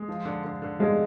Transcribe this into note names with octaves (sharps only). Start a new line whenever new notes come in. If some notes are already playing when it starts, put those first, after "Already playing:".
Already playing: G#3
F3
D3
D3
D3
F3 G#3